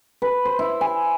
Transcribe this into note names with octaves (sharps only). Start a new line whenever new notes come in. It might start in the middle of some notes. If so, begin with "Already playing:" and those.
B4
C5
E4
G#5